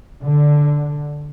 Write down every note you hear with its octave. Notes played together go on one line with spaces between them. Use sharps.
D3